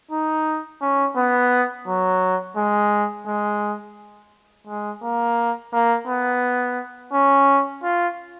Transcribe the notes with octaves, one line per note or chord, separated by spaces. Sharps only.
D#4
C#4
B3
F#3
G#3
G#3
G#3
A#3
A#3
B3
C#4
F4